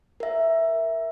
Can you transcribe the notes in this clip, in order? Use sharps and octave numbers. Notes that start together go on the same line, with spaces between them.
A#4 E5